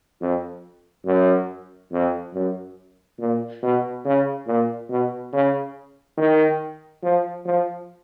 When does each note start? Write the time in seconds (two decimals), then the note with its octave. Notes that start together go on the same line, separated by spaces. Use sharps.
0.21 F2
1.06 F#2
1.92 F2
2.33 F#2
3.19 A#2
3.63 B2
4.05 C#3
4.47 A#2
4.89 B2
5.33 C#3
6.17 D#3
7.03 F3
7.45 F3